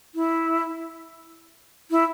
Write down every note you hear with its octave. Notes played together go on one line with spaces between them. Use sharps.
E4
E4